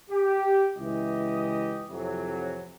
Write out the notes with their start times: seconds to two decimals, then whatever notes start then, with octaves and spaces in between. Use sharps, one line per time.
0.10 G4
0.78 C#2 E3 E4 G4 D#5
1.90 F2 A2 C3 E3 F#3